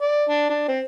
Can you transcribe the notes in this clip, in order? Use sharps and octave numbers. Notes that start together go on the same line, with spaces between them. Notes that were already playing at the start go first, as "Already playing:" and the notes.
D5
D4
D4
C4